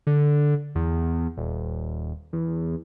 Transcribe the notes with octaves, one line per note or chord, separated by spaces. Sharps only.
D3
E2
D#1
E2